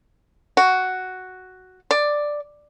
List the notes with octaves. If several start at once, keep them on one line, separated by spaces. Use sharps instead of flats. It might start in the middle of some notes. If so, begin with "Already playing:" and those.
F#4
D5